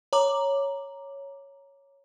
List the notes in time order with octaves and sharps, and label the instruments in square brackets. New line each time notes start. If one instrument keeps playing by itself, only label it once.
[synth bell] C#5 A#5 D6 F#7